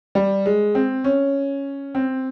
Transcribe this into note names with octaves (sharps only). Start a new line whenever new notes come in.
G3
G#3
C4
C#4
C4